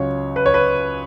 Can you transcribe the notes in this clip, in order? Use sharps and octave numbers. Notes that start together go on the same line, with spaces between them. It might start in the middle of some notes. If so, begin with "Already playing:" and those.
Already playing: C#2 C#3 F#3 C#5
B4
C#5
B4